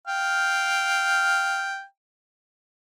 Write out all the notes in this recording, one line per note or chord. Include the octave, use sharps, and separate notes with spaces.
F5 G5